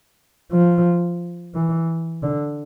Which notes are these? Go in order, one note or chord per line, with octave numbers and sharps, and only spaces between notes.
F3
E3
D3